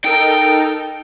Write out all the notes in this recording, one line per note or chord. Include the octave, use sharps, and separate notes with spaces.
D#4 A4 A#4 G5